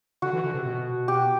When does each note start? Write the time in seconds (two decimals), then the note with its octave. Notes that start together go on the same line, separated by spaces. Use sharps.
0.22 D3 F#4
0.33 E3
0.44 D3
0.54 C3
0.66 B2
1.08 G4